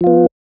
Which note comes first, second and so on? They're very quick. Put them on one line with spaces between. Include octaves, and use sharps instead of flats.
F3 F4 B3